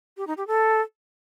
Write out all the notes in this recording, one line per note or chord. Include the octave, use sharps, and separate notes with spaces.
G4
D#4
G4
A4